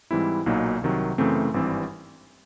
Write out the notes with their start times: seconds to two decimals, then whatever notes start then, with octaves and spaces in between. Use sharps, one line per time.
0.11 G#2 E3 G3 C4 E4
0.46 B1 A#2 F#3 A#3 D#4
0.82 C2 C3 D#3 F#3
1.18 F#2 C#3 E3 A3 C4
1.54 G#1 G2 E3 G3 C4